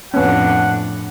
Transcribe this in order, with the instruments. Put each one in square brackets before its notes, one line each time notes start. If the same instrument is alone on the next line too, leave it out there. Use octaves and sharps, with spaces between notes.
[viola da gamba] F2 A2 D4 [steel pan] B3 C#4 [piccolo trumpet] F#5